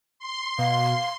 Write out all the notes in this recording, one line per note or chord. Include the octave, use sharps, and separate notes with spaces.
C6
B2 F5